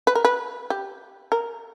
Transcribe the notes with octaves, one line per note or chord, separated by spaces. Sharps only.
B4
A#4
B4
G4
A#4